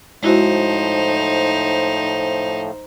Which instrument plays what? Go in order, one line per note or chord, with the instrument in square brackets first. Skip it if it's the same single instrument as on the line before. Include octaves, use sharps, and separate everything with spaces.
[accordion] A2 F3 A3 [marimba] G#3 E4 F#4 [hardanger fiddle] D#4 C5